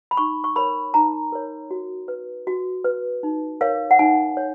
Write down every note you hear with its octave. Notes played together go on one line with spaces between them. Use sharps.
B5
D#4 C#6
C#6
A#4 C#5 B5
D#4 A#5
A#4 C#5
F#4
B4
F#4
B4
D#4
A#4 C#5 F5
F#5
D#4 G#5
C#5